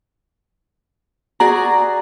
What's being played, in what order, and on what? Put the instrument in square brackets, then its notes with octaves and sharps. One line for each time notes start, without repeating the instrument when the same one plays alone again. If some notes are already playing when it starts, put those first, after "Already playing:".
[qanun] F#4 G#4 D5 [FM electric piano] A#5